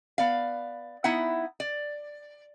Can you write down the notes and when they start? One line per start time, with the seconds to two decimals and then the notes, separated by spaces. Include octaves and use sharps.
0.18 B3 D5 F5
1.04 B3 D#4 E4 E5 F#5
1.60 D5